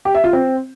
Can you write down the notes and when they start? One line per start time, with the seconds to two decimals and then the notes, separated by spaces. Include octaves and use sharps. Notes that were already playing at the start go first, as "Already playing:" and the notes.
0.05 G4
0.15 E5
0.24 F4
0.33 C4